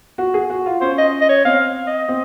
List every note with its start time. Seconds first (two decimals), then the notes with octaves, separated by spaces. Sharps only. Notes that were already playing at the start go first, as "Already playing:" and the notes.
0.18 F#4
0.34 G#4
0.50 F#4
0.66 F4
0.81 C#4 C5
0.98 D#5
1.21 D#5
1.29 C#5
1.45 C4 F5
1.87 D#5
2.09 C4